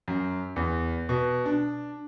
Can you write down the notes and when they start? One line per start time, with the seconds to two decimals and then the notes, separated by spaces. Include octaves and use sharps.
0.08 F#2
0.56 E2
1.09 B2
1.46 D4